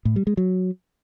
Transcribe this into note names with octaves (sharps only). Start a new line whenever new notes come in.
A2
G3
G#3
F#3